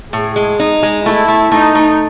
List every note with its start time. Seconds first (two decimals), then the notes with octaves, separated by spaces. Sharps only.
0.13 A2 G#4
0.36 G#3
0.60 D#4
0.83 G#3
1.06 A3 E4
1.28 A3
1.51 A3 D#4
1.75 A3